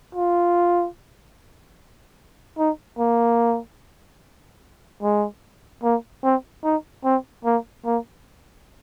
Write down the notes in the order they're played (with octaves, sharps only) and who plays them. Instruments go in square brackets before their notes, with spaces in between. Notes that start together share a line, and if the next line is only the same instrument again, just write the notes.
[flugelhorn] F4
D#4
A#3
G#3
A#3
C4
D#4
C4
A#3
A#3